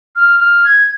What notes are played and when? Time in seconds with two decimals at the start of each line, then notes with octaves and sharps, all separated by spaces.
0.15 F6
0.39 F6
0.64 G#6